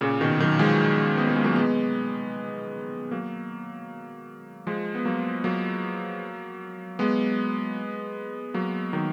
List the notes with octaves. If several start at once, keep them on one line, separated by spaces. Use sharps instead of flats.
A#2 C#3
B2 D#3
D#3 F#3
F3 G#3
B3
A#3
G#3
F#3 A#3
G#3 B3
F#3 A#3
F3 G#3
B3
F#3 A#3
F#3 A#3
G#3 B3
F#3 A#3
D#3 F#3